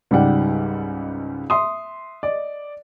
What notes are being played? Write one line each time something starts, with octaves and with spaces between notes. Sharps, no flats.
C#2 G#2 G3 D5 F#5 G5
E5 C6 D#6
D5 D#5